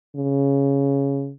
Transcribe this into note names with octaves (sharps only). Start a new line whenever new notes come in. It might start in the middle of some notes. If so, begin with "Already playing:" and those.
C#3